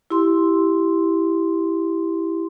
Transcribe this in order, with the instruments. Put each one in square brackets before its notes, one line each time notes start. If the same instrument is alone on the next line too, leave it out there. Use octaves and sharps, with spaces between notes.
[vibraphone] E4 G4 C6